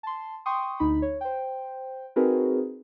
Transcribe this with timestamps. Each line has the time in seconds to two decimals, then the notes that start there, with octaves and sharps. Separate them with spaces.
0.03 A5 C6
0.46 G5 C6 C#6 D#6
0.80 D2 D#4 B5
1.02 C#5
1.21 C5 G5
2.16 C4 D#4 F#4 G#4 A#4 B4